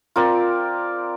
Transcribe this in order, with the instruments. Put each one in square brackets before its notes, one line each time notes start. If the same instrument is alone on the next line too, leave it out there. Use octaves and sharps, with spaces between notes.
[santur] C4 F4 A#4 D5